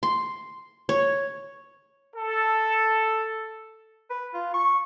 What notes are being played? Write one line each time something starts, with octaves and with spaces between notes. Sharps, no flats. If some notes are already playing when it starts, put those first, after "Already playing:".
C6
C#5
A4
B4
F4
C#6